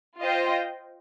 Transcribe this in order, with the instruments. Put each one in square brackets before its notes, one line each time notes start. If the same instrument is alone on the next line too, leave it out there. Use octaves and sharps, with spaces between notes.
[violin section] F4 C5 D#5 G5